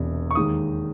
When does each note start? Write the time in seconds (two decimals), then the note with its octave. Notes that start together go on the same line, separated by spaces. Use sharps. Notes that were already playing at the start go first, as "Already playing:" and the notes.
Already playing: E1 E2 C3
0.31 C#6
0.35 D#2 D#3 G#3 D#6